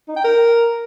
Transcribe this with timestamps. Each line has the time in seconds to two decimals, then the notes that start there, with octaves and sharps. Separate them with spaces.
0.08 D#4
0.16 G5
0.24 A#4